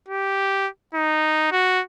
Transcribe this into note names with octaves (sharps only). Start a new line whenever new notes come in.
G4
D#4
F#4